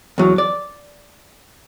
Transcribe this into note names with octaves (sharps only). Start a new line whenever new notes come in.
E2 F#3
D5